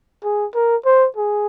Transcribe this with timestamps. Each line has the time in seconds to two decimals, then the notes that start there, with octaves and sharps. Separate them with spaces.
0.24 G#4
0.55 A#4
0.86 C5
1.16 G#4